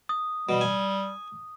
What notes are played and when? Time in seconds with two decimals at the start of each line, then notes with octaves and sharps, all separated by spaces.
0.09 D#6
0.49 B2 G3
0.61 G#5